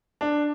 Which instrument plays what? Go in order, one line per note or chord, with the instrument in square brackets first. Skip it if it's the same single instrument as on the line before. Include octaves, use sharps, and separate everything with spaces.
[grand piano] D4